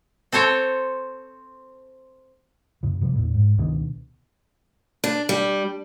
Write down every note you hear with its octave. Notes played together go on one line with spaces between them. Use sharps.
C4 A4 C5 C#5
F#2 C#3
C3 F3 G3
E2 A#2
G#2
C#2 B2 D3 D#3
D4
G3